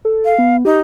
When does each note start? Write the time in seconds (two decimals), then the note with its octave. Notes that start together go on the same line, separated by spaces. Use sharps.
0.05 A4
0.25 F5
0.38 B3
0.65 D#4 G4